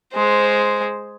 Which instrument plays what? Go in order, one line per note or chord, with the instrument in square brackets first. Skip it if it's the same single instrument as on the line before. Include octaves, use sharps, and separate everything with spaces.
[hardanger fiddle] G#3 C5